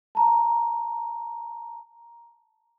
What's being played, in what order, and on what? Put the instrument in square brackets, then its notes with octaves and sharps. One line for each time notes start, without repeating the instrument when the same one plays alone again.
[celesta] A5 A#5